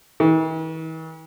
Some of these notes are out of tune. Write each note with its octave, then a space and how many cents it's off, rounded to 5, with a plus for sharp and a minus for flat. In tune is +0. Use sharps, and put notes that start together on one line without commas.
E3 -45